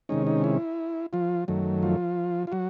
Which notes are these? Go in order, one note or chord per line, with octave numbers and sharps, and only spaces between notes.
C3 D#3 G#3 C#4 D#4
D#4
E4
F3 F4
F#2 D#3 F#3 A3
F3 F4
F4
F#3 F#4